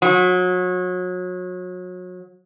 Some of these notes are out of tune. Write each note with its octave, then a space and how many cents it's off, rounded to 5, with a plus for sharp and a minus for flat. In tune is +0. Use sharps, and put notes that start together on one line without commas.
F#3 -30